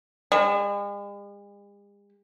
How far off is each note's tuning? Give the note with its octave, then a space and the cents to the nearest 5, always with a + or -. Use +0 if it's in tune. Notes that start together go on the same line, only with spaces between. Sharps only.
G#3 -45